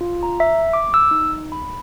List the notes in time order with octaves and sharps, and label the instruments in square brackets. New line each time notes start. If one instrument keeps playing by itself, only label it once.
[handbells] F4
A#5
E5
D6
E6
D#4
B5